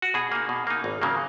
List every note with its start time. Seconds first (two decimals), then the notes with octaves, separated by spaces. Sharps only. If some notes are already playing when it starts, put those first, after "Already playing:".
0.02 F#4
0.14 B2 G#4
0.32 A#3 D#4
0.49 B2
0.67 A#3 D#4
0.84 G#1
1.02 C#3 F#3 A#3